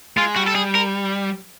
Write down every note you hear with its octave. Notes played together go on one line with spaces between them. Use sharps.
G#3 F4
G3 F#4
A4
G#4
A#4